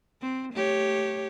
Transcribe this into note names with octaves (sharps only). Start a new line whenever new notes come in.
C4
A3 G4 C#5